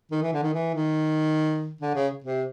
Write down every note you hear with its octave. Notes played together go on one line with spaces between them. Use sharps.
D#3
E3
D3
D#3
E3
D#3
D3
C#3
C3